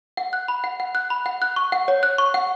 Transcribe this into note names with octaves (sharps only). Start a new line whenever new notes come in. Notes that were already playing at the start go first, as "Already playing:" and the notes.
F#5
F#6
B5
F#5
F#5
F#6
B5
F#5
F#6
C#6
F#5
C#5
F#6
C#6
F#5